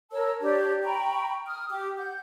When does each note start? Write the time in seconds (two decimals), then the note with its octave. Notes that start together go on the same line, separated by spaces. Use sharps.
0.12 A#4 C#5 A5 E6
0.41 D4 G4 C#5 D5
0.84 G5 A#5 B5 C#6
1.46 D#6 F6
1.69 G4 D6
1.97 F#5 G6